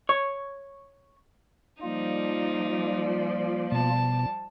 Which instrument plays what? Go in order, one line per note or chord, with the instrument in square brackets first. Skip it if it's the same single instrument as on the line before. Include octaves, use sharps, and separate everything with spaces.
[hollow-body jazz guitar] C#5
[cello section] F3 G3 D5 [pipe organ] A#3 F4 [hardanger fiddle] D#4
[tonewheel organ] B2 [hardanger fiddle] A5